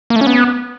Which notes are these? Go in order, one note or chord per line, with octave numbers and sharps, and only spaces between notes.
A#3
A3
C#4
B3